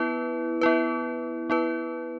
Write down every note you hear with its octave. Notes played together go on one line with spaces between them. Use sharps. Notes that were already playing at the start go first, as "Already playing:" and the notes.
Already playing: B3 E4 B4
B3 E4 B4
B3 E4 B4